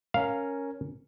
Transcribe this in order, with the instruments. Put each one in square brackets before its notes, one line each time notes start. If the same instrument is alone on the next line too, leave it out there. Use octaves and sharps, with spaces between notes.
[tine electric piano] C#4 A#4 [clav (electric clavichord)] F5